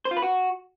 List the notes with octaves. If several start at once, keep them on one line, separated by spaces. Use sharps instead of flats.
C5
F4
B4
F#4